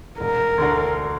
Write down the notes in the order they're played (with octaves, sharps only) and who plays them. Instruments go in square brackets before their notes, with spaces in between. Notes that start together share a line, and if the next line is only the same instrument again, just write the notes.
[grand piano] E1 [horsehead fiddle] A#4
[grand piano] D2 D3